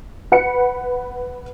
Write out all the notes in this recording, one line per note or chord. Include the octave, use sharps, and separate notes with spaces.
B4 F#5 B5 C#7